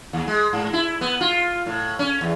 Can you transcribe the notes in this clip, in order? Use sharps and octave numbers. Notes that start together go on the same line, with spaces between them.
D#2
G#3
G#2
E4
B3
F4
A2
C#4
E2